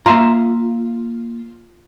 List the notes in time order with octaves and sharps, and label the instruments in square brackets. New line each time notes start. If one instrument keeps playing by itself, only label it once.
[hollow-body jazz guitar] A#3 E5 A#5 [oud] F4